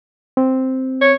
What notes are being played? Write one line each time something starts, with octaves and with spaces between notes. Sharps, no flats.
C4
C#5